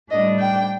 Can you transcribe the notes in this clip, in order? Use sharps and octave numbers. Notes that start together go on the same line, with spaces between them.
A2 G3 D4 D#5
G5